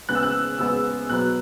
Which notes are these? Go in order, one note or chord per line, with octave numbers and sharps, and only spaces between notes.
C#3 G#3 B3 F#6
E6
F#6
C#3 G#3 B3 E6
B2 F#3 B3 F#6